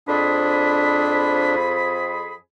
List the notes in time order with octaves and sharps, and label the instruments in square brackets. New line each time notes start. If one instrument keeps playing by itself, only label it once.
[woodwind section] F2 G#4 B5 [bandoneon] D4